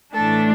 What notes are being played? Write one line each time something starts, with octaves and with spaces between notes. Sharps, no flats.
A2 E3 A3 D4 A4